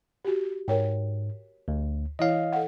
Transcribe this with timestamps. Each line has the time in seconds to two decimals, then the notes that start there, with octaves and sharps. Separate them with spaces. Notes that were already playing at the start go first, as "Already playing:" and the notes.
0.25 F#4 G4
0.68 G#2 A#4 C#5 G5
1.68 D2
2.19 E3 E4 C#5 D#5 F5
2.53 A4 F#5